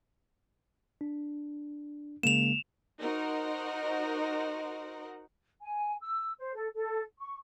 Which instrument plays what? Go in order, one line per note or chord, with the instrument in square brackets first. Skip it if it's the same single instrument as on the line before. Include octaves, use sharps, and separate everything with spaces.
[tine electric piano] D4
[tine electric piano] C#3 G#3 A#3 [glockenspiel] E7 F7
[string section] D#4 F#4 A#4 C5 F#5
[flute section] G#5
E6
C5
A4
A4
C#6